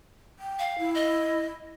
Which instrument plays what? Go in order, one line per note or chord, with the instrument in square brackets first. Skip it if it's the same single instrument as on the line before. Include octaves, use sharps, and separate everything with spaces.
[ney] G5
[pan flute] F5
[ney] E4
[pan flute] D#5